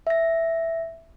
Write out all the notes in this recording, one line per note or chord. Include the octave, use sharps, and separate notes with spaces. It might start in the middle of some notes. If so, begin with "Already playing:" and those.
E5 A#6